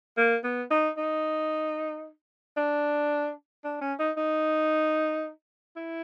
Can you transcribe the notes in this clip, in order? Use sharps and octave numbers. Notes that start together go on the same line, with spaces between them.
A#3
B3
D#4
D#4
D4
D4
C#4
D#4
D#4
E4